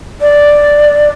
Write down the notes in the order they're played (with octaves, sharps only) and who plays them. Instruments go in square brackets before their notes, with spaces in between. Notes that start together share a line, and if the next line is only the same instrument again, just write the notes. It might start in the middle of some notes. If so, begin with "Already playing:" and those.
[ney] D5